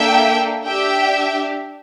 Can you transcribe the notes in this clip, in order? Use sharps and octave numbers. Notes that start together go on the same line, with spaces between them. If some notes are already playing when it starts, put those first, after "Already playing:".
Already playing: A#3 D4 A4 E5 G5
D4 G4 E5 G5